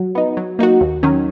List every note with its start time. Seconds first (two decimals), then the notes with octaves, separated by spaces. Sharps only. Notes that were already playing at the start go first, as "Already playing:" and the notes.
Already playing: F#3
0.15 B3 D#4
0.37 F#3
0.59 A#3 D#4 F#4
0.81 D#2
1.03 D#3 F#3 C#4